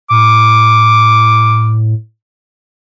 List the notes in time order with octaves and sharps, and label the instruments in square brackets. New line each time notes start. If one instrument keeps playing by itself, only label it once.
[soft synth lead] A2 [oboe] D6